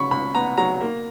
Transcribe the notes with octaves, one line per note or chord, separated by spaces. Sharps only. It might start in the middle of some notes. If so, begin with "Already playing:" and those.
Already playing: C#3 F#3 B5 C#6
C#2 B5
B3 A#5
F#3 A#5
A#3